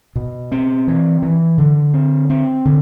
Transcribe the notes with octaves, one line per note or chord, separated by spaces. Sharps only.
B2
C4
E3
E3
D3
C4
C4
D3